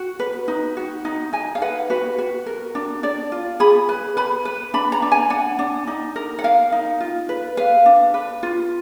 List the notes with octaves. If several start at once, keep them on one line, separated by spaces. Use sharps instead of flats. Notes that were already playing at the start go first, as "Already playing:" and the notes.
Already playing: F#4
B4
D#4
F#4
D#4
D#4 G#5
F5
B4 F#5
F#4 B4
F#4
A#4
D4
D4 D5
F4
G#4 B5
B4
B4 B5
B4
D4 B5
A#5
D4
G#5
D4 F#5
D4
D#4
A#4
F#5
A#4 F5
D#4
F4
B4
B4 F5
D4
B4
F4